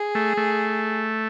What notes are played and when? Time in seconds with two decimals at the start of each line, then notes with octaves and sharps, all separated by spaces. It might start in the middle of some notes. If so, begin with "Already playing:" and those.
Already playing: G#4
0.15 A3
0.37 A3